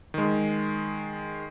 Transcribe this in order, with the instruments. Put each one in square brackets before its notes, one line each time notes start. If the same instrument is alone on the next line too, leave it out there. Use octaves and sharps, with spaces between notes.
[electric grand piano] D#3 G#3